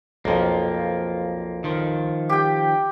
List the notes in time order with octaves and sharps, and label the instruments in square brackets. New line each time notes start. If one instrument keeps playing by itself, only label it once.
[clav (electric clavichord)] B1 F2 [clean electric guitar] F3 A#3
[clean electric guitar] D#3 F3
[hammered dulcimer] G4 G5